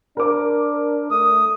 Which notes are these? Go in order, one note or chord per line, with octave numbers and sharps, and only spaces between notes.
D4 A#4 C5 D6
A3 D#6